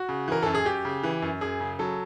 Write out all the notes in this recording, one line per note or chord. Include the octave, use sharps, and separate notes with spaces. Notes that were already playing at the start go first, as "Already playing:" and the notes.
Already playing: F#4
C#3
E3 A#4
F#2 A4
G#4
F#2 G4
C#3
E3
F#2
F#2 G#4
C#3
F#3 A4